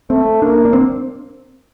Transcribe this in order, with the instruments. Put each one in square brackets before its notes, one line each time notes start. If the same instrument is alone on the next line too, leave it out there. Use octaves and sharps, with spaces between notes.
[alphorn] A3 [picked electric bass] C4
[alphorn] A#3 [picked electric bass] D4
[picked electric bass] D4
C4